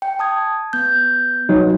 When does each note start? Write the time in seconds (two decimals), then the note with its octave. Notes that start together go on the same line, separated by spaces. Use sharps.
0.02 G5
0.19 A5 D#6 G#6
0.73 B3 G6
1.49 F#3 D#4